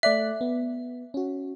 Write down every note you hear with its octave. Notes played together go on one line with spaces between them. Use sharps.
A3 D5 E5 F#6
B3
C#4 F#4